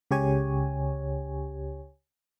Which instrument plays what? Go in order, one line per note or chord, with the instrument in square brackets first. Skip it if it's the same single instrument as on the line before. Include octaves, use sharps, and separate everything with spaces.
[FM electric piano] C#2 C#3 G4 C#5 G#5